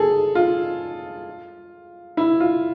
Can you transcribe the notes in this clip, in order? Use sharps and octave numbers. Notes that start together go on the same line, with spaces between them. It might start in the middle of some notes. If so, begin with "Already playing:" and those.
Already playing: G#4 A4
F4
E4
F4